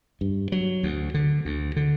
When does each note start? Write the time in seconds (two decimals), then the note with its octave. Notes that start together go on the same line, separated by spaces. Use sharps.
0.21 G2
0.52 F#3
0.83 D2
1.14 D3
1.45 D2
1.76 D3